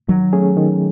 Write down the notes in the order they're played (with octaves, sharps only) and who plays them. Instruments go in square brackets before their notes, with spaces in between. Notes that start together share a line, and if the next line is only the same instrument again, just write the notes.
[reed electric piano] D#3 [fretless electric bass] F#3
[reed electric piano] A3 C#4 G#4
D#3